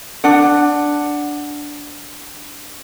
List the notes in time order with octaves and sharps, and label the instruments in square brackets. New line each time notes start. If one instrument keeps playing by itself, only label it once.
[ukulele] D4 F#5